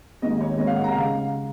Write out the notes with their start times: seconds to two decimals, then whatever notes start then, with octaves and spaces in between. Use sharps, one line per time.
0.22 D#2 D#3 G#3 D#5
0.41 C#5
0.58 D#2 D#3 G#3 D#5
0.67 F5
0.75 F#5
0.84 A#5
0.92 C#3 G#3 F5